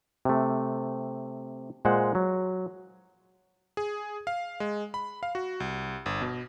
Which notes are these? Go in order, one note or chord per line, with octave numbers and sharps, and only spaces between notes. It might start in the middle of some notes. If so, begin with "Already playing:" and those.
C3 A3
A#2 G#3 C5 F#5
F#3
G#4
F5
G#3
B5
F5
F#4
C2
G1
B2